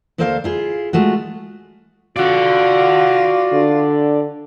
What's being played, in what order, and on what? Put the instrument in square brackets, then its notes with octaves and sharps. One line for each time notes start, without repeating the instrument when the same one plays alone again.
[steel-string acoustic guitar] D2 A#3 A4 C5 D5 F5
E4 F4 G#4
G#3 A3 F4 F#4
[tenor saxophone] F4 [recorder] F#4 [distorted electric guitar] D5 F#5
[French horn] D3